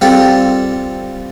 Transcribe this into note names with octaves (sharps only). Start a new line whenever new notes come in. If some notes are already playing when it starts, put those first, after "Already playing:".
G3 C4 F4 A4